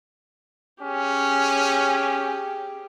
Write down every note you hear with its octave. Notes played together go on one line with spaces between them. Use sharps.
C#4 G4 G#4